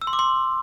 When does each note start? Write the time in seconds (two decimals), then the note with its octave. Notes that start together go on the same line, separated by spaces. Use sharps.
0.02 E6
0.07 C6
0.13 D6
0.19 C6